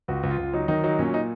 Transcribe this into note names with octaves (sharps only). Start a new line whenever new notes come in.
C#2 F#4
C#2
F4
C#2
F#3 D#4
D#3 D#4
F#3 D#4
A#2 C#4
D#4